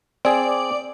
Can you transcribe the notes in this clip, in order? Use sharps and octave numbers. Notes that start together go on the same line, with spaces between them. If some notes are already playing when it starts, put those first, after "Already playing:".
C4 G#4 D5